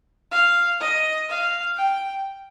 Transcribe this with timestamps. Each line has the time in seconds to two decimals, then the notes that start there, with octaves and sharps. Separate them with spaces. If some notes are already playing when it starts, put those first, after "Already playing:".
0.31 F5
0.80 D#5
1.29 F5
1.77 G5